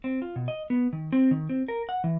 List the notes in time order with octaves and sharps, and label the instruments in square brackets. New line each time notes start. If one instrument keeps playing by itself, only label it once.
[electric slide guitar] C4
F4
B2
D#5
B3
D#3
C4
D#3
C4
A#4
F#5
E3